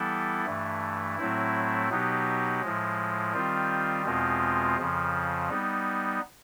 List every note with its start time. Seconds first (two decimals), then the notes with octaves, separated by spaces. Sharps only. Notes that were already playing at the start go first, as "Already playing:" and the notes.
Already playing: E3 G3 B3 E4 A4
0.46 G2 E3 A3
1.17 A2 F#3 A3 C4 E4
1.90 B2 F#3 B3 D#4 G4
2.61 A2 F3 G#3
3.33 D#3 G3 C4 F4
4.04 E2 B2 G#3 C4 F4
4.77 F2 C#3 F3
5.49 G3 B3 D#4